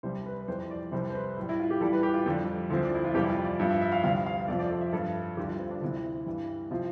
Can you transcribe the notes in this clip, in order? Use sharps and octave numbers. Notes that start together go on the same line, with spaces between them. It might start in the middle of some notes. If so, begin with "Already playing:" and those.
C2 C3 G3 C5
B4
B4
F2 E3 G3 C5
D5
C2 C3 G3 C5
C5
B4
A2 G3
E4
F4
G4
A2 E3 G3 A4
B4
G4
F4
F2 D3 G3
D2 D3 F3 C4
D4
E4
F4
F2 C3 E3 G3 G4
E4
F4
D5
G2 F3 E5
E5
E5
F5
D2 C3 G3 F5
F5
F2 C3 F3 D5
D5
A4
E5
G2 F3 A4
D2 D3 G3 G4
F4
C4
D4
D2 C3 E3 E4
G2 E3 G3
C3 F3 F4